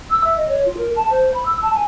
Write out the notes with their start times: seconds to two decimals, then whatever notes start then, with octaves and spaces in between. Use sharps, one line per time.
0.10 E6
0.24 E5
0.36 D#5
0.48 C#5
0.65 F4
0.77 A#4
0.95 A5
1.10 C5
1.34 B5
1.45 E6
1.61 A5
1.74 G#5